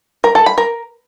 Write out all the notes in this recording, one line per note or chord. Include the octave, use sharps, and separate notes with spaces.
A#4
A4
B5
A#4